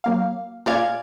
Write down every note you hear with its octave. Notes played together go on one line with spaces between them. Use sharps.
F#3 A#3 F5
A#2 G#3 D5 F5 G#6